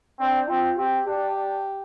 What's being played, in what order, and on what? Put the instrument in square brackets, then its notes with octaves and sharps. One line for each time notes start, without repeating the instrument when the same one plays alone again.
[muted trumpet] C4 [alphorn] D4
[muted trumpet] C4 [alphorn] F4
[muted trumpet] C4 [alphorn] G4
[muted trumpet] D4 [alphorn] G4
[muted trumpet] D4